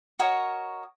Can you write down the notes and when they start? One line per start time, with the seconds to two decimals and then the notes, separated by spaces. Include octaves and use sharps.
0.19 F#4 A#4 C#5 D#5